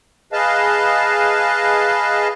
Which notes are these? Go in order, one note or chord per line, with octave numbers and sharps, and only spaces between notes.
G#4 B4 D#5 F5 A5